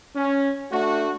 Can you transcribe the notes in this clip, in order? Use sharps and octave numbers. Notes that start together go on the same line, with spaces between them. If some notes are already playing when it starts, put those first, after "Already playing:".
C#4
A3 D4 F#4